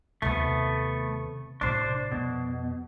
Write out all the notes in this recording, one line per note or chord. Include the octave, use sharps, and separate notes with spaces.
D#2 C3 A3 B3
A1 C3 D4 C5
F2 B2